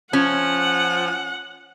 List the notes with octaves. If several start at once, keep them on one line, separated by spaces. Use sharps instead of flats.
F3 C#4 F#5